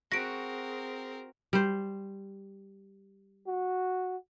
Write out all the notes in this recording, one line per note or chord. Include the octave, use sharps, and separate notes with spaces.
C4 F#4 G#4 A#4 A#6 B6 D7
G3 C5
F#4